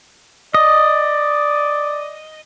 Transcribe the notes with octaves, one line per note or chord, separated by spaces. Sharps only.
D5 D#5